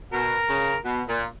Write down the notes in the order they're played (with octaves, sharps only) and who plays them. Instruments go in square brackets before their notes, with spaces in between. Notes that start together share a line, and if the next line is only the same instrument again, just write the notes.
[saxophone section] B2 [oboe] A#4
[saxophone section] C#3
B2
A#2